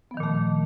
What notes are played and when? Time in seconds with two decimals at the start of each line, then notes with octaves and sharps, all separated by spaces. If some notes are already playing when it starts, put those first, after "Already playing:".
0.11 B3
0.14 F3
0.17 D#3
0.20 A#2
0.23 A3